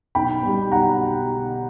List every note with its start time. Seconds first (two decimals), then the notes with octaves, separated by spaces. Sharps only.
0.15 B1 G5 B5
0.43 B2 G3
0.72 B1 F#5 A#5